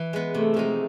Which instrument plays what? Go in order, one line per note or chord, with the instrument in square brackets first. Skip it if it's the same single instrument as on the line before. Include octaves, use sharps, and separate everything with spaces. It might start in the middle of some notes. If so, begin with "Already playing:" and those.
Already playing: [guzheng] E3
G#3 B3
[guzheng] C3 [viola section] A3
[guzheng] F3 G#3 C4 D#4